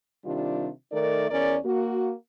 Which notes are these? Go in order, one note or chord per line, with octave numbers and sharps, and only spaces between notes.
C3 D#3 G3 D4 F4
D#3 A3 D#4 A4 A#4 D5
E2 C#4 A#4 D5
A#3 F#4